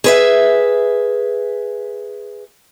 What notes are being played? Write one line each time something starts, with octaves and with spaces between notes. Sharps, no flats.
G#4 B4 E5